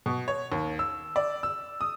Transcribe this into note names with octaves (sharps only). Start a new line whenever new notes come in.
B2
C#5
D#2
E6
D5
E6
D#6